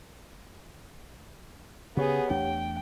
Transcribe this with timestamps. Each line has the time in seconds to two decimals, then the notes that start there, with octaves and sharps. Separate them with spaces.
1.97 C#3 B3 G4 G#4 C#5 F#5
2.30 E2 A3 D4 G5